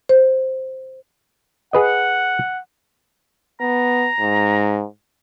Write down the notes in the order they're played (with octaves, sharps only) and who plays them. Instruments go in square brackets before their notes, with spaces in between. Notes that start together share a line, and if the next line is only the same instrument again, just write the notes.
[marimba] C5
[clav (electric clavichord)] G#4 B4 D#5 [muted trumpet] F#5
[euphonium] B3 [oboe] A#5
[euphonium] G#2